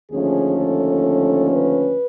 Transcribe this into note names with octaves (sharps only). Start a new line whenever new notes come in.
D#2 D3 F3 A3 C#4 G#4
A4
B4